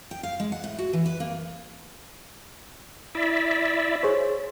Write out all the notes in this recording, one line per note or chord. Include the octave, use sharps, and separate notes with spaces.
G5
F5
G#3
F#5
A2
F#4
E3
B4
A#3
E4 D5 E5
G#4 C5 C#5